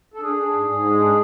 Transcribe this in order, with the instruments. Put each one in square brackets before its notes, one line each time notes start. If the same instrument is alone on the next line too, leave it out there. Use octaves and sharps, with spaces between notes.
[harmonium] A4
D4 G#4
D4
G#2
G#2
G#3
D4